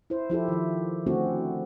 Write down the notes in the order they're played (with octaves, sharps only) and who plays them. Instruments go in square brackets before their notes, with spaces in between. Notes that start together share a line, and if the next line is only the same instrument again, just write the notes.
[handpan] E4 C5
F3 E4 G4 A4
D#3 F3
D3 A3 C4 C#4 E4 F#4